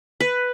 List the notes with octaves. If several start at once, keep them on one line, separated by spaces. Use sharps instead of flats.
B4